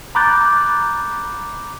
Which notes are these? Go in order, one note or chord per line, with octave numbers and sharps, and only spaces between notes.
A#5 B5 D6 F#6 G6 A6